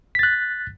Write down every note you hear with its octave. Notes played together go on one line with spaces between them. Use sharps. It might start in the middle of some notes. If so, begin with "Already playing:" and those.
F#6 A6 B6